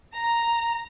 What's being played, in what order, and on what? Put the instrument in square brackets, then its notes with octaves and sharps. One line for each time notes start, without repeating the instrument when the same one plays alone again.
[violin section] A#5